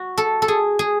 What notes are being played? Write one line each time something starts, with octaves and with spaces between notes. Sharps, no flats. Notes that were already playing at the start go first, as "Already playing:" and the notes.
Already playing: F#4
A4
A4
G#4
G#4